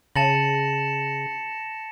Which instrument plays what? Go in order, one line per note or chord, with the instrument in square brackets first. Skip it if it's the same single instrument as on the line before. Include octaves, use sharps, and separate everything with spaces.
[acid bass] C#3 [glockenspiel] A5 A6 F#7 [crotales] A#6 C#7 E7